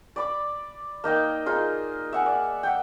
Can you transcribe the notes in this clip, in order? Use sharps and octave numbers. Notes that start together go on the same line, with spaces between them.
D5 B5 D6
A#3 D#4 D#5 G5
D#4 F4 G#4
E5 F#5 G#5
D5
E5 F#5 G5